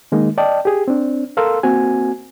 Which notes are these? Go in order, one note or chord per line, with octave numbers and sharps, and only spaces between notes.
D#3 G#3 A#3 D#4
D5 D#5 G5 A5
G4 G#4
C4 D4
A4 A#4 F5 C6 E6
A#3 C4 F#4 G#5